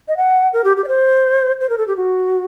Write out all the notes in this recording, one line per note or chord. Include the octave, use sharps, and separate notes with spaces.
D#5
F#5
A#4
G4
G4
D5
C5
C5
A#4
A4
G4
F#4